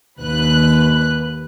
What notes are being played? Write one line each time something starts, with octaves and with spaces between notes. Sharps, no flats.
D#2 B4 F#6